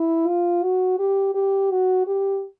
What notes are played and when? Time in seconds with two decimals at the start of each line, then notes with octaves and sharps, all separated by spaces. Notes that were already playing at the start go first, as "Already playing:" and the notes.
Already playing: E4
0.27 F4
0.63 F#4
0.99 G4
1.34 G4
1.70 F#4
2.07 G4